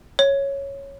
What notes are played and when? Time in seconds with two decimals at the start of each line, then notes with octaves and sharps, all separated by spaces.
0.19 C#5